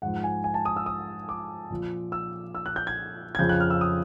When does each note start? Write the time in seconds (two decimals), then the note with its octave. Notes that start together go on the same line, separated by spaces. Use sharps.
0.02 G#2 F3 F#5
0.24 G#5
0.44 G#5
0.54 A5
0.65 D#6
0.76 E6
0.86 D#6
1.29 D6
1.70 A#2 F3
2.12 E6
2.55 E6
2.66 F#6
2.76 G6
2.87 G#6
3.35 G#6
3.39 F2 C#3 F3 G6
3.49 F#6
3.60 F6
3.70 E6
3.81 D#6